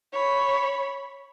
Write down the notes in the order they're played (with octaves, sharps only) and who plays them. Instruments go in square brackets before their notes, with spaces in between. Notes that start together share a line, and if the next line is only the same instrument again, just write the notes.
[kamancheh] C#5 B5